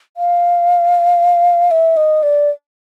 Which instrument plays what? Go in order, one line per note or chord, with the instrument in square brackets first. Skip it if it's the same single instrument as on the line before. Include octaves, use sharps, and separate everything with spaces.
[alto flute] F5
E5
D#5
D5